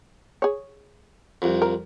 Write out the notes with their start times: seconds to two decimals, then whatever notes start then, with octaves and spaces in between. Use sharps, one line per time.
0.42 G#4 C#5
1.42 C2 F2
1.62 A#4